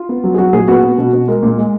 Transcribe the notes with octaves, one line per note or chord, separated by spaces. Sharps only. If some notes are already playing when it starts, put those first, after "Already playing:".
Already playing: F4
B3
F#3
G#4
F#3 F#4
A#2 G#4
B3 F#4
B3
B2
B2
G#3 A#4
A#2
G#3